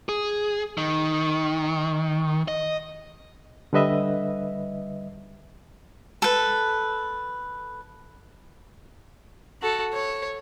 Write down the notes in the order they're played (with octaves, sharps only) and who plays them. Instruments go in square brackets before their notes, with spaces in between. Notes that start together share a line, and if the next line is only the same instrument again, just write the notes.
[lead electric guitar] G#4
D#3
D#5
[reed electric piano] D3 G3 B4 D#5 E5
[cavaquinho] A4 B4
[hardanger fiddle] F#4 A4
C#5